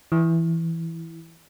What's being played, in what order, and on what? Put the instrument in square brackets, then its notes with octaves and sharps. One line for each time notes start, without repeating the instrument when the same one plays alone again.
[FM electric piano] E3